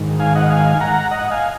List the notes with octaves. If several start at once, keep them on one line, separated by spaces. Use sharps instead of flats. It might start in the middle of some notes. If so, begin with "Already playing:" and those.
Already playing: G#2 D#3
F5 G#5
D#5 F#5
F5 G#5
F#5 A#5
D#5 F#5
F5 G#5